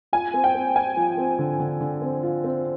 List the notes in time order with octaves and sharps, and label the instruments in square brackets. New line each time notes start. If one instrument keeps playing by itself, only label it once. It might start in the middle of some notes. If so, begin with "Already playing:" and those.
[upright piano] F4 [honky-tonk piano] G#5
[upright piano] C4
[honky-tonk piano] G5
[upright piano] C4
[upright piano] C4 [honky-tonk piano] G#5
[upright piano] F3
C4
D3
D3
D3
C4
F4
C4